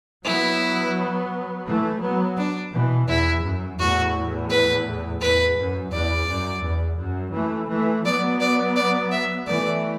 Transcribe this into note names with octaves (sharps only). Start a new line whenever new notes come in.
F#3 B3 E4
E3 A3
F#3 B3
D4
B2 E3
E2 E4
F#2
E2 A2 F#4
B4
E2 B4
F#2
E2 D5
F#2
E2
F#2
E3 A3
E3 A3
F#3 B3 D5
D5
D5
E5
E3 A3 D5